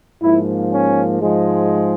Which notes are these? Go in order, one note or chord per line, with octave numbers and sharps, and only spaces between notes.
G#2 F3 A#3 E4
C#4
G#2 F3 G#3